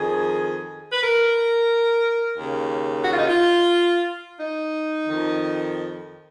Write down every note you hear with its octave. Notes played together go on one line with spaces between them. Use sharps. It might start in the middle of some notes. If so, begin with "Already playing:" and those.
Already playing: F2 D#3 G#4
B4
A#4
D#2 C#3
F#4
F4
D#4
F4
D#4
F2 D#3